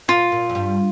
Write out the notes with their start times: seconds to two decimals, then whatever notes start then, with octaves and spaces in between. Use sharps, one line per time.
0.08 A#2 F4
0.32 A#2
0.49 F2
0.55 G2